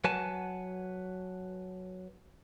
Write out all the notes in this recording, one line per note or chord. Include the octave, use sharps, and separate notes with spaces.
F#3 B4 F#5 G#5 A5